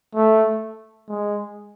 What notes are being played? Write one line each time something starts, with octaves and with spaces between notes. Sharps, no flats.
A3
G#3